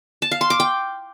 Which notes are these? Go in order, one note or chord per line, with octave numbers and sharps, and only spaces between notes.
A5
F5
C6
D6
G5